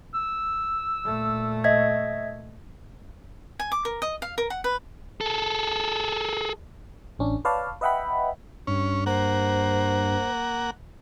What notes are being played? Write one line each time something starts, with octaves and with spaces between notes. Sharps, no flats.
E6
A#2 A3
D#5 E5 G#6
G#5
D6
A#4
D#5
F5
A#4
F#5
B4
G#4 A4
A1 C#4 D4
B4 C#5 D5 F5 A5
B4 D#5 E5 F#5 G5 B5
G2 C#4
A#3 C5 F#5